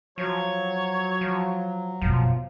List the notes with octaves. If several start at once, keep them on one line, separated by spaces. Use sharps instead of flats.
F3 F#3 C#5
F3
F#2 B2 F3